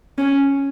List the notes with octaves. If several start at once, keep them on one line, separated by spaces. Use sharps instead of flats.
C#4